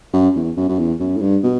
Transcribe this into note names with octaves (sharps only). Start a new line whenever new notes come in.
F#2
E2
F#2
F#2
E2
F#2
A2
G2
B2